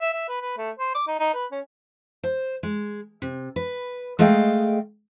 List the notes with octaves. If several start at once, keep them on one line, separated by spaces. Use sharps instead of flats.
E5
E5
B4
B4
A3
C5
D6
D#4
D#4
B4
C#4
C5
G#3
C3
B4
G#3 A3 D#5 F5 G5